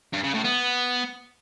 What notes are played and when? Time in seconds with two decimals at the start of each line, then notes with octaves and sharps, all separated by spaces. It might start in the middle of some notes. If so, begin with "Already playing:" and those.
0.13 G2
0.24 C#3
0.34 A2
0.45 B3